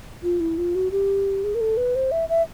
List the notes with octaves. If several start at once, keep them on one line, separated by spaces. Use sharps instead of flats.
F4
E4
F4
F#4
G4
G#4
A#4
A4
B4
C5
E5
E5